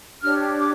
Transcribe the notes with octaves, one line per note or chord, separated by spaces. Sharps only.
D4 G4 C#5 F6
D6